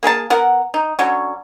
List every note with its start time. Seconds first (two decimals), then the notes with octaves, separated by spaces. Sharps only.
0.03 A#3 G#4 A#4 A5
0.30 B3 A#4 F#5
0.74 D#4
0.99 D3 F#3 C#4